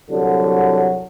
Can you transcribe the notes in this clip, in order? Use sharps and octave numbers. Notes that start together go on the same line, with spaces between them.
C2 D3 F#3